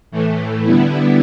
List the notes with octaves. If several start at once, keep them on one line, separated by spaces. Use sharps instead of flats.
A2 E3 A3
D3 G3 B3 E4